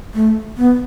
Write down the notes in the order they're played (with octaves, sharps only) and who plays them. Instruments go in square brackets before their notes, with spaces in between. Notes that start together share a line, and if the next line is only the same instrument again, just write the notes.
[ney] A3
B3